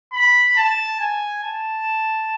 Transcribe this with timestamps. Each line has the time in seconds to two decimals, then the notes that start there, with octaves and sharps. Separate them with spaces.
0.13 B5
0.57 A5
1.00 G#5
1.44 A5